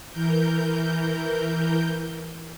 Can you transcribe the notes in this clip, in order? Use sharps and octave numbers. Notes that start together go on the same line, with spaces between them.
E3 A#4 G6